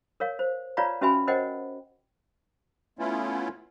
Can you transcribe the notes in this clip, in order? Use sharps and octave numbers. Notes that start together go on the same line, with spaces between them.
A#4 C#5 F5
C5
F4 B4 C#5 D5 F5 A#5
C#4 F#4 B4 E5 G#5 B5
A#4 C5 C#5 D#5 F#5 G5
A3 B3 C#4 E4 F4